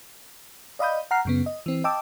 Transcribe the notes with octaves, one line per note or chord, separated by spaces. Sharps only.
D5 D#5 F5 B5 D#6 G6
F#5 A#5 F6 C7
F#2 C#3 B3
D#5
E3 C4
D#5 G5 A5 D6 E6